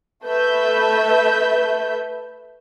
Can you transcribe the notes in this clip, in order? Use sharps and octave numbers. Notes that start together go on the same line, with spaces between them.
A3 B4 E5 G6